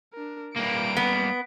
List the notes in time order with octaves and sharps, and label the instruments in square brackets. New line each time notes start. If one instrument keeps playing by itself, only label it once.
[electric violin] D4 A#4
[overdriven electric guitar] G3 A#3 [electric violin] B4 D7
[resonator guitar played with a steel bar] B3